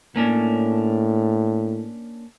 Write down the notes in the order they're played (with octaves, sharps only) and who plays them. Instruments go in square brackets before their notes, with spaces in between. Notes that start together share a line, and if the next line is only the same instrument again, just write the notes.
[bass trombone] A2 [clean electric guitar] A#3 C#4 D4